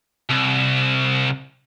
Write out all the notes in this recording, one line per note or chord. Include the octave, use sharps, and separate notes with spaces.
C2